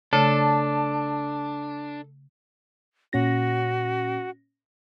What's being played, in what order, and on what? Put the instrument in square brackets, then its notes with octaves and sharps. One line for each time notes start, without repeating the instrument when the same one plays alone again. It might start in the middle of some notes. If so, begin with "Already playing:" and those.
[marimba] C#3 A3 [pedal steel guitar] D4 [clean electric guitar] A4
[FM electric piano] A#2 C#4 A#6 [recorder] F#4